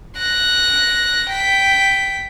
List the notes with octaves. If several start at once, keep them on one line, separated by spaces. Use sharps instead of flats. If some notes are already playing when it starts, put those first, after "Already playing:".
F#6 A#6
G5 B6